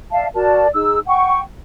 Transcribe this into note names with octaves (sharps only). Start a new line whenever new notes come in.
D5 E5 F5 A5
F#4 A#4 D5 A5
D#4 G#4 E6
F#5 G5 C#6